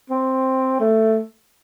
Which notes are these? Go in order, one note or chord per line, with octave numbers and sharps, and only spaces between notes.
C4
A3